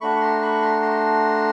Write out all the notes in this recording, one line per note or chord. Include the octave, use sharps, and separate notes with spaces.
A3 D4 F#4 B5 C#6
C#6
A#5 C6
B5 C#6
A#5 C6
A#5 C6